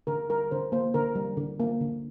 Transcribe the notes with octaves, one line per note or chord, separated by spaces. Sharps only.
D3 A#4
G3 A#4
D3 C5
A#3 C5
D3 A#4
G3
D3
A#3
D3